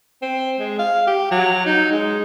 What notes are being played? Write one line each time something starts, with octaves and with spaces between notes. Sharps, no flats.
C4
G#3
F5
G4
F#3
D#4
G#3